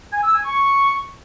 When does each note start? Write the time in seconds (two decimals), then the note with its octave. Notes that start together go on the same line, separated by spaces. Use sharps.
0.12 G#5
0.23 E6
0.34 G#5
0.45 C#6